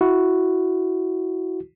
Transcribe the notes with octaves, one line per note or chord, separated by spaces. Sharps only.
E4 F#4